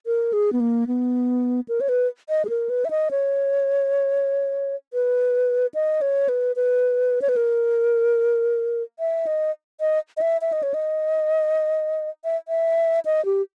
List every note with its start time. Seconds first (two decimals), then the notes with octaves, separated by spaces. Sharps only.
0.06 A#4
0.33 G#4
0.53 B3
0.60 A#3
0.87 B3
1.68 A#4
1.81 C#5
1.89 B4
2.29 D#5
2.45 G#4
2.49 A#4
2.69 B4
2.85 E5
2.90 D#5
3.11 C#5
4.93 B4
5.74 D#5
6.01 C#5
6.29 B4
6.56 B4
7.22 C#5
7.29 B4
7.36 A#4
8.99 E5
9.27 D#5
9.80 D#5
10.17 D#5
10.21 E5
10.41 E5
10.52 D#5
10.63 C#5
10.74 D#5
12.24 E5
12.48 E5
13.05 D#5
13.25 G4